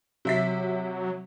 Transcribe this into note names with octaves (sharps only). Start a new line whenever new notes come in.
C3 F#3 E5 B6